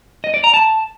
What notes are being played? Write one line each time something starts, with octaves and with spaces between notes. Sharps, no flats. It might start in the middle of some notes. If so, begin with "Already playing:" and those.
D#5
D5
A#5
A5